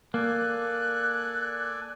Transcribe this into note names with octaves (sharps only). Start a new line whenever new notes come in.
A#3 A4 D5 G#5 F#6